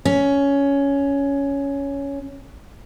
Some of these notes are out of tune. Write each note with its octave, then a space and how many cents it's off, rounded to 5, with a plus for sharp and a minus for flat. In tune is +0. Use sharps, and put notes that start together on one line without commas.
C#4 +10